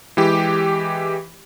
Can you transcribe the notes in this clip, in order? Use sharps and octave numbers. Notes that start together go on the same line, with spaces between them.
E3 G#3 E4 G4